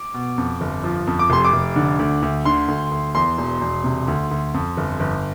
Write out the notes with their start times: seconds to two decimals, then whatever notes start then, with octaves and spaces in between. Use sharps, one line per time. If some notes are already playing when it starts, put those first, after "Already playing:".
Already playing: D6
0.14 B2
0.38 F2
0.61 G1
0.84 F3
1.07 F2
1.19 D6
1.30 F1 C6
1.45 D6
1.53 F1
1.76 D3
1.99 D2
2.22 D2
2.45 D3 C6
2.68 D2
2.91 D2
3.15 E2 C6
3.38 E1
3.61 E1
3.84 C3
4.08 D2
4.31 D2
4.54 F2
4.77 G1
5.00 G1